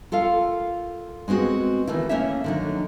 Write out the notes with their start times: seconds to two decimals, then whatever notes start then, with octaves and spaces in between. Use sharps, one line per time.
0.12 F4 A4 A#4 F5
1.28 G#3 B3 C4 F#4 G#4
1.87 D#3 E3 A3 E4
2.09 A3 A#3 C#4 C#5 E5
2.44 D3 D#3 F#3